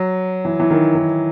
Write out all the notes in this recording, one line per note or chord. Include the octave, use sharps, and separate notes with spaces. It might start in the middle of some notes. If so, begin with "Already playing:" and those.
Already playing: F#3
E3
E3
D#3
D#3